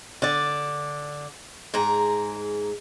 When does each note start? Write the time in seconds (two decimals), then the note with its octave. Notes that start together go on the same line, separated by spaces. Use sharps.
0.22 D3 D5
1.74 G#2 G#4 A#5